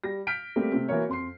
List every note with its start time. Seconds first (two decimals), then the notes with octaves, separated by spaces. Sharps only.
0.04 G3 A#6
0.27 F6 G6 B6 D7
0.56 G3 A3 A#3 C4 G4
0.72 C3 A3 C4
0.88 E3 A#3 F#4 A#4 C#5
1.08 F2 C6 C7